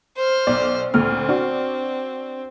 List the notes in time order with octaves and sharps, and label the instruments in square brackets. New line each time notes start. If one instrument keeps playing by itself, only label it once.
[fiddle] C5 F6
[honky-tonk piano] B1 D5
[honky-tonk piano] D2 A#2 F6 [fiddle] C4
[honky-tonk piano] D4 F#4